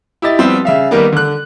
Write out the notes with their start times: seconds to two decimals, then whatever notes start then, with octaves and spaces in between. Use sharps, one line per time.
0.22 E4 G4 D#5 A6
0.39 F3 G3 B3 C4
0.65 C#3 E5 F5
0.91 D#3 G3 A#3 B3
1.13 D3 F#6